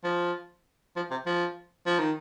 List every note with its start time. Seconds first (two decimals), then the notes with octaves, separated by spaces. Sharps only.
0.04 F3
0.96 F3
1.11 C3
1.26 F3
1.86 F3
1.99 D#3